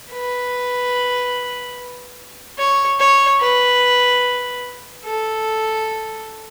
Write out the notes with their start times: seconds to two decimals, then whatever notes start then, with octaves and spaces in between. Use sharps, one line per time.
0.12 B4
2.58 C#5
3.00 C#5
3.41 B4
5.05 A4